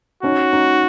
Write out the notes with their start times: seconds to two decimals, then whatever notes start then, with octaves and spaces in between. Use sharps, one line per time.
0.23 C#4 D#4 F#4
0.53 C#4 D#4